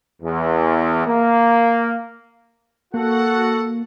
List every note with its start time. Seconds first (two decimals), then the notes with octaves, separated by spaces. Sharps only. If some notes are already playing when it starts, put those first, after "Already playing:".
0.21 E2
1.06 A#3
2.94 A#3 F#4 A4 F#5